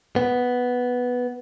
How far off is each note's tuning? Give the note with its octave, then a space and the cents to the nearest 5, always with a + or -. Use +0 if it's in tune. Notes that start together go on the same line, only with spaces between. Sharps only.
B3 +0